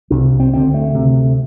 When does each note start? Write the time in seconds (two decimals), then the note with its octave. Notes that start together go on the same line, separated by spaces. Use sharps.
0.10 C2 C3 D4
0.40 C4
0.52 D2 D3 C4
0.74 A3
0.94 D2 C3